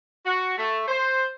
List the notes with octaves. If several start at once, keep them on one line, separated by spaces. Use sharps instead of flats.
F#4
A3
C5